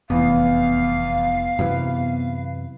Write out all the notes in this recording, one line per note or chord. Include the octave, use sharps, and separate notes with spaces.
F1 E2 E3 B3 F5
F#2 C3 E3 B4